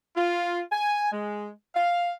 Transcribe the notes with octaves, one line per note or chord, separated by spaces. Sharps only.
F4
G#5
G#3
F5